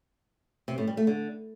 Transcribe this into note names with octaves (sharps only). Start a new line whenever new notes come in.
C3
A2
G3
A3
D3